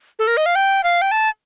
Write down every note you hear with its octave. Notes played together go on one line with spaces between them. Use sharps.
A4
A#4
D#5
F5
G5
F5
G5
A5